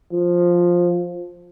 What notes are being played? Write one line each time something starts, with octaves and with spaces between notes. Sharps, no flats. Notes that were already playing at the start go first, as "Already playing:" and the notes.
F3